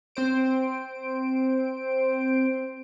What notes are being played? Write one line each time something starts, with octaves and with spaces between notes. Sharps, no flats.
C4 C5 D7